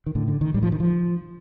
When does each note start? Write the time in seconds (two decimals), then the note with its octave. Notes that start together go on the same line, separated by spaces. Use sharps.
0.06 D#3
0.15 A2 D3
0.28 D3
0.41 D#3
0.54 A2 G3
0.63 F3
0.72 D#3
0.80 F3